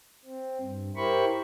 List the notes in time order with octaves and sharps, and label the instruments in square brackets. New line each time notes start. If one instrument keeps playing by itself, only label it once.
[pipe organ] C4
G2
E4 G4 A#4 C5 B5 C#6